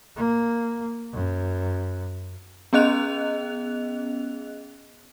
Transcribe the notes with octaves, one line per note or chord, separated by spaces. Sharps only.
A#3
F#2
B3 C#4 G#4 D#5 F#6 F7